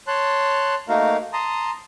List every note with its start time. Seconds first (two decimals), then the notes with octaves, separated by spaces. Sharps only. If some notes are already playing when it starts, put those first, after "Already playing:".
0.07 C#5 A5 C6 F#6
0.89 A3 A#3 D#4 F#4 A#4 F5
1.33 A5 A#5 C6 D#6